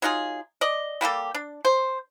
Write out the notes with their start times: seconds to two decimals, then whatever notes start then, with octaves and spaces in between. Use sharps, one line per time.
0.02 F#3 D#4 F4 G#4
0.61 D5 D#5
1.01 G3 A#3 G4 A4
1.35 D4
1.65 C5